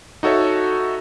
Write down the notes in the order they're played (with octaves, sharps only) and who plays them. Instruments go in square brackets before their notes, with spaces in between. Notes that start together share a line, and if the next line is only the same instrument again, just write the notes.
[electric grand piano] D#4 F#4 A4 C#5 E5